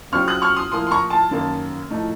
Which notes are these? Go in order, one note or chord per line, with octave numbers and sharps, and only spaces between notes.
C#3 F#3 C4 F4 C#6 F6
D#6 F#6
C#6 F6
C6 D#6
A2 F3 A#3 C6 D#6
C6
A#5 C#6
A5 C6
F#2 D#3 A#3 C#4
A2 F3 A3 D#4